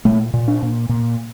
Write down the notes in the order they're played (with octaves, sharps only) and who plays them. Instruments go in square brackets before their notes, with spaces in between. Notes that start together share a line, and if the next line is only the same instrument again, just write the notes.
[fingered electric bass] A#2 A3
A#2
D4
A#2
A#2